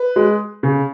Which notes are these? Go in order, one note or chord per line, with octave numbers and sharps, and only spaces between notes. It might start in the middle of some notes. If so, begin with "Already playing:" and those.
Already playing: B4
G#3
C#3